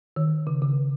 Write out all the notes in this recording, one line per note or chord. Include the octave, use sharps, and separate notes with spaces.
D#3
C#3
C#3